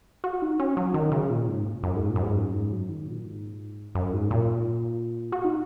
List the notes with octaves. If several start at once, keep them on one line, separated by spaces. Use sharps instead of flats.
F#4
D#4
C#4
F#3
D#3
C#3
A#2
G#2
F#2
G#2
A#2
F#2
G#2
F#2
G#2
F#3
D#3
A#2
G#2
F#2
G#2
A#2
F#4
D#4